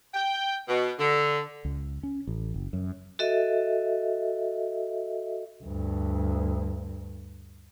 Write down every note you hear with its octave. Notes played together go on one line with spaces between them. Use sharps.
G5
B2
D3
C#2
C#4
A1
F#1
F#2
F#4 A4 D#5 E5
D2 G2